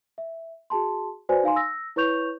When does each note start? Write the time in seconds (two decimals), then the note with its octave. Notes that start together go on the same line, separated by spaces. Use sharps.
0.18 E5
0.70 F#4 G#4 A5 C6
1.29 F#4 B4 C5 D5 G#5
1.44 D#4 F5 G#5 C6
1.56 E6 A#6
1.96 E4 B4 C#5 C#6 G6 F7